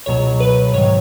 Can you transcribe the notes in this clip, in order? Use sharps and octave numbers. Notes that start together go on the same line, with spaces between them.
C#2 B2 F#3 C#5
B4
G#2 D#3 F#3 C#5